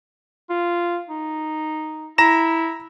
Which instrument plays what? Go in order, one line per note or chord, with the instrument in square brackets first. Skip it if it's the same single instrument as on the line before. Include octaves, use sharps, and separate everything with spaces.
[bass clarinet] F4
D#4
[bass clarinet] E4 [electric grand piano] A#5 A#6 E7